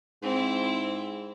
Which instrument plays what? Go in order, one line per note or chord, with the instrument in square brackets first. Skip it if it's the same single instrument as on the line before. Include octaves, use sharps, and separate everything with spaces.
[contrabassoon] G#2 [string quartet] C4 E4